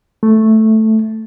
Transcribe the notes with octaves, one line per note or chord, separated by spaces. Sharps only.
A3